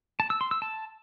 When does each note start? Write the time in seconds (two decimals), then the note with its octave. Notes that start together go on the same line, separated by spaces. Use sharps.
0.20 A5
0.30 E6
0.41 C6
0.51 E6
0.62 A5